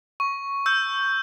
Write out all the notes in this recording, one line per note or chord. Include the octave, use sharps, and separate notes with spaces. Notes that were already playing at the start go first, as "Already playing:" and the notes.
C#6
E6 G6